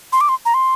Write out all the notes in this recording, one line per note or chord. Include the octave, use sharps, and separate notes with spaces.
C6
D6
C6
A#5
C6